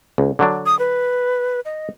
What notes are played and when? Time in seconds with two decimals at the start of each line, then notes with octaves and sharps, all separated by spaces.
0.18 C#2
0.39 D3 F#3 D4
0.66 D#6
0.79 B4
1.65 D#5